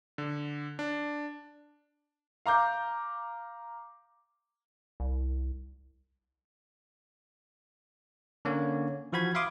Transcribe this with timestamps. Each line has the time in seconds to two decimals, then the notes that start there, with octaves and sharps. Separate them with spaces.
0.18 D3
0.79 D4
2.46 F5 A#5 D6 G6
5.00 C2
8.45 D3 A#3 C#4 C#5
9.12 E3 F3 F#4 B5 G#6
9.35 E5 F5 B5 C6 D6 D#6